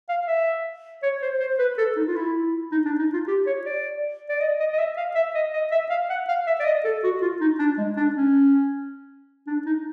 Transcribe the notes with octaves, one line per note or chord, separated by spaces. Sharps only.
F5
E5
C#5
C5
C5
B4
A4
D#4
F4
E4
D#4
D4
D#4
F4
G4
C#5
D5
D5
D#5
D#5
D#5
E5
F5
E5
D#5
D#5
E5
F5
F#5
F5
E5
D5
D#5
A4
F#4
F4
D#4
D4
G#3
D4
C#4
D4
D#4